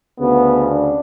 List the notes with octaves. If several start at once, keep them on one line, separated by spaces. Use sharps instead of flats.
D2 C#3 B3
D4